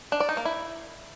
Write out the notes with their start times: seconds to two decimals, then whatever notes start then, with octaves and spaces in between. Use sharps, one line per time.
0.12 D4
0.20 D5
0.29 D#4
0.37 A#3
0.45 E4